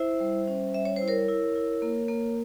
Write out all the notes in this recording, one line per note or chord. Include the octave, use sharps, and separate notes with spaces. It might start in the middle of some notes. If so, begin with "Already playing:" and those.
Already playing: E4 C5 E5
G3
C#4
G3 E5
C#5
C5
E4
A#4 C#5
E4
E4
A#3
A#3